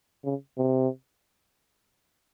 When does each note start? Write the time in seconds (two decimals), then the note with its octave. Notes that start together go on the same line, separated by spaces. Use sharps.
0.24 C#3
0.58 C3